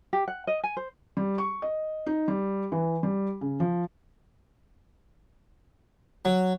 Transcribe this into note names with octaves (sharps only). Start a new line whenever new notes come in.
G4
F#5
D#5
G#5
C5
G3
C#6
D#5
D#4
G3
E3
G3
C#3
F3
F#3